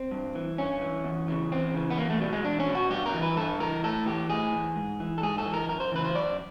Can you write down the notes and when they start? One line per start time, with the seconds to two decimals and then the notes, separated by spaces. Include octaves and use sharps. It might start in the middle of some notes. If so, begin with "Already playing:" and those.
Already playing: C4
0.11 G2
0.35 E3
0.58 G2 C#4
0.81 E3
1.04 E2
1.28 C#3 E3
1.51 E2 C4
1.74 C#3 E3
1.90 B3
1.97 E2 A#3
2.10 A3
2.21 B2 G3
2.33 G#3
2.44 E2 D4
2.60 C#4
2.68 B2
2.75 F#4
2.90 G2 G4
3.06 A#4
3.13 E3
3.22 B4
3.36 G2 A4
3.60 E3 A#4
3.84 A2 A4
4.06 E3 G4
4.30 A2 G#4
4.53 E3
4.76 G#2
5.00 E3
5.18 A4
5.22 G#2 G#4
5.38 A4
5.45 E3
5.54 A#4
5.69 F#2 A#4
5.80 C5
5.92 C#3 E3 B4
6.04 C5
6.15 F#2 D5